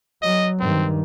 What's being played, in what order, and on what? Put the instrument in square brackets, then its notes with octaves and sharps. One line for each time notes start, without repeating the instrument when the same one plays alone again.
[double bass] F#3 [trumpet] D#5
[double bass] G2 D#3 [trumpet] C4